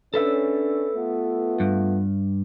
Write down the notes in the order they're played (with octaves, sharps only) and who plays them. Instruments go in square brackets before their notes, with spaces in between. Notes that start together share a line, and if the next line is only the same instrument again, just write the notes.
[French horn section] C#4 D4 [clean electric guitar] A4 B4 E5
[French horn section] A3 B3 F4
[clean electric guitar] G2